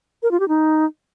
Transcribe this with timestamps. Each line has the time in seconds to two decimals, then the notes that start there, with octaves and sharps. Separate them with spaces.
0.23 A#4
0.31 F4
0.40 G4
0.48 D#4